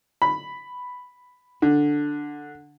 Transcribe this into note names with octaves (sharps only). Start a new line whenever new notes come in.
B5
D3